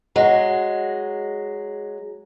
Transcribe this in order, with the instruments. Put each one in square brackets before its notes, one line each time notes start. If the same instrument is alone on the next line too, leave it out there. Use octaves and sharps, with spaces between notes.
[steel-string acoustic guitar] F#3 G#3